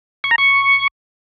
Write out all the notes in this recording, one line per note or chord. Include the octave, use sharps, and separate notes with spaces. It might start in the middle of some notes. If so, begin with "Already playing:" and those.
C#6
A#5
C#6